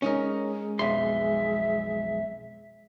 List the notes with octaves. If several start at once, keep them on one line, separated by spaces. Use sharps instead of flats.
G#3 C#4 D#4 A#4
B1 F2 E5 C6